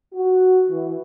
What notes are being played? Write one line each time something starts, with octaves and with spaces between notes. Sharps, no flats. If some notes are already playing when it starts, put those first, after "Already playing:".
F#4
E3